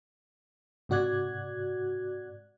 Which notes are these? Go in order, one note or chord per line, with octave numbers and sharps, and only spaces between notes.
G#2 C3 F#4 D5 F#6 G#6